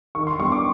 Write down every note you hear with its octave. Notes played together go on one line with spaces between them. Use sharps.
D#3 C#6
C6
G3 B3 C#6
D6